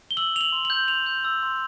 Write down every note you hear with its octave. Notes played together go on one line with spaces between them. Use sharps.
G7
E6 F#7
E6 F7
F#7
C6
F#7
G6
C6 F7
G6
E6
C6